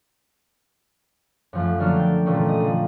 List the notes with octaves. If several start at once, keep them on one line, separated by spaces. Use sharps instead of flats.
F#2 F3 A3
D3 F#3 A3 A#3 D4 F6
G5 A5
A#2 D3 E3 A3 A#3 C#4
D#5
D3 F3